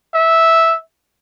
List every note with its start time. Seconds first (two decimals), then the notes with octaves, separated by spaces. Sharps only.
0.14 E5